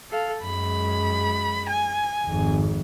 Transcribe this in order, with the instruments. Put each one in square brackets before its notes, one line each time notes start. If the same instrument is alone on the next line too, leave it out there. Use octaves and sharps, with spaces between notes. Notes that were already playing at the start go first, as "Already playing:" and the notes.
[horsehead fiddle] A4 F5
[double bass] F#2 G#3 [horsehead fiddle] B5
[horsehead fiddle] G#5
[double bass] G#1 F2